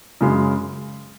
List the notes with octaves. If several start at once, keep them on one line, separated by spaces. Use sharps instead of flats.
F#2 C#3 G#3